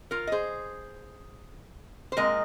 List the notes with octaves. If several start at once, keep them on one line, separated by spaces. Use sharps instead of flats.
F4 A#4
D#5
G#4 C5
C5
A#2 G#3 C4 A#4 D#5